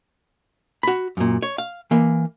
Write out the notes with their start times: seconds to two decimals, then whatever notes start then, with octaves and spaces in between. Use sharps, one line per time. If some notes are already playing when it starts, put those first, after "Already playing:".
0.83 F#4 B5
1.17 F#2 A#2
1.43 C#5
1.58 F5
1.91 E3 A#3